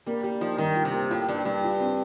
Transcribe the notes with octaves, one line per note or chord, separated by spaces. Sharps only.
G3 A#3
G3 G4
F3 D#4
G2 D#3
F4
C3
A#3
A2 F4
G2 D4
G2 G3
F4
C4